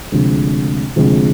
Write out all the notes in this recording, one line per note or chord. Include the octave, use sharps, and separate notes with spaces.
D2 C3 F3 G#3
D2 C3 F3 G#3